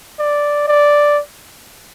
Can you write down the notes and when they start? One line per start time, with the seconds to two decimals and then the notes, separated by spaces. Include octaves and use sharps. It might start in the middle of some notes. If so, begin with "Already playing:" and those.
0.19 D5
0.68 D5